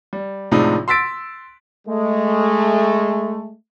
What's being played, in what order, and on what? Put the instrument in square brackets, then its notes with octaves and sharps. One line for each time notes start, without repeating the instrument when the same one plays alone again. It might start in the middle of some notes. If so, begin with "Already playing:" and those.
[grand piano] G3
A2 C3 F3 G#3 D4 D#4
C6 E6 A6 B6 D7
[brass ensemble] G#3 A3